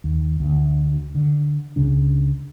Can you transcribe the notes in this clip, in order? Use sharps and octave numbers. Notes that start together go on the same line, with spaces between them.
D#2
D2
D3
C#2 C#3 D4